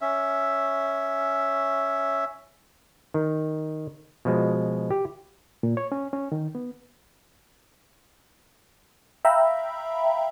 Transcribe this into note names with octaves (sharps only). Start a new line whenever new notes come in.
C#4 E5
D#3
B2 F3 G#3
G4
A#2
C#5
C#4
C#4
D#3
B3
E5 F5 G5 A#5 B5